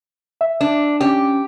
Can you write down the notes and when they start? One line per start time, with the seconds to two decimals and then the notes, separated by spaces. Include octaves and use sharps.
0.41 E5
0.61 D4
1.01 C#4 G4